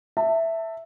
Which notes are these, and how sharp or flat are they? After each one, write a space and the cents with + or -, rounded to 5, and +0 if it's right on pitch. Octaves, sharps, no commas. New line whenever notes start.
E5 +0 A5 +25